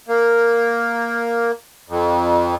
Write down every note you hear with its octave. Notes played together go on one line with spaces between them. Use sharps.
A#3
F2